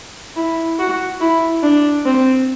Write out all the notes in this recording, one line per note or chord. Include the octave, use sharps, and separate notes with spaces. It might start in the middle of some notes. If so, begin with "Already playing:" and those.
E4
F#4
E4
D4
C4